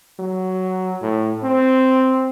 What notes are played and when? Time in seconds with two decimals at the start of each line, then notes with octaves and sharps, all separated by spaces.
0.19 F#3
1.02 A2
1.43 C4